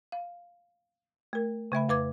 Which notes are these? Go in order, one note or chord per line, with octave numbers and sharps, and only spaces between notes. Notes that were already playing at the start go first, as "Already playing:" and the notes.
F5
A3 A#4
C#3 A3 E5 B5
F2 B4 D6 G#6